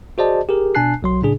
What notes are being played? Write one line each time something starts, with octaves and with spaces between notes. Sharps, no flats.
F#4 G#4 C5 D5 D#5 A5
G4 G#4 A#4
B2 D4 G#5 A5 F#6 C7
B1 F#3 C6
A2 C#3 D4 G#4